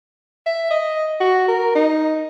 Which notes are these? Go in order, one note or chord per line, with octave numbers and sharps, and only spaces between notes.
E5
D#5
F#4
A#4
D#4